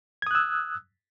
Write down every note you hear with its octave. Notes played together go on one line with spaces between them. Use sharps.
D#6 E6 F#6 G#6